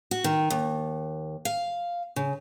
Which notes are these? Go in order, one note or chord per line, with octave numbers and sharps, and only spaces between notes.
F#4
D#3
D#2
F5
C#3